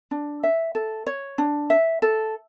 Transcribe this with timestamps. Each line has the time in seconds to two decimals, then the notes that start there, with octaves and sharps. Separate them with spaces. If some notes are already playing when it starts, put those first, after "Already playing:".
0.11 D4
0.43 E5
0.75 A4
1.07 C#5
1.38 D4
1.70 E5
2.02 A4